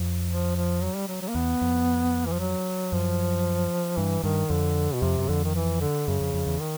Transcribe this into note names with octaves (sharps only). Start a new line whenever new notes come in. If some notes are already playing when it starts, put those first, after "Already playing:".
Already playing: F2
F3
F3
F#3
G3
F#3
F#3
A#3
E2 B3
F2
E3
F3
F#3
F#2 F3
G2 E3
G2 D#3
F2 D3
B2
F2 C3
F#2
F2 D3
D#3
E3
D3
F#2 C#3
F2
F2
E2
D#3